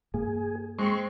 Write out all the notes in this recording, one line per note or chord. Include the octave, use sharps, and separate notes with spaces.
G2 A#3 G#4
G#3 C4 C6 C#6